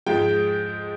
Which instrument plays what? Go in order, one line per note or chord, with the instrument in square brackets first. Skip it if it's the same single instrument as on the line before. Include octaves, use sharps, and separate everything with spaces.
[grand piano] G#2 F3 G#3 G5